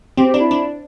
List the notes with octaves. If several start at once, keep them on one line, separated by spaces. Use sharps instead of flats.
C4 G4
G4
D4
E4
D4